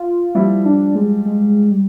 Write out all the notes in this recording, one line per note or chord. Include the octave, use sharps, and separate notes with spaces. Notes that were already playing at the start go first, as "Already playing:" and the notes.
Already playing: F4
F3 G3 E4
D4
G#3
G#3
G3